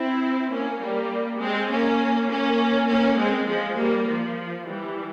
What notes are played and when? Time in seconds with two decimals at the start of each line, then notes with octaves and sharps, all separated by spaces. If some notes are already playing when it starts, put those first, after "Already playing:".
Already playing: C4 E4
0.50 A#3 C#4
0.81 G3 A#3
1.40 G#3 C4
1.70 A#3 C#4
2.29 A#3 C#4
2.88 A#3 C#4
3.17 G#3 C4
3.47 F3 G#3
3.77 G3 A#3
4.07 F3
4.65 E3 G3